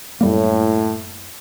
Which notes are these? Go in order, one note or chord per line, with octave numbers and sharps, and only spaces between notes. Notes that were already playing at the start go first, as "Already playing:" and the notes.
F#2 A2 G3 A#3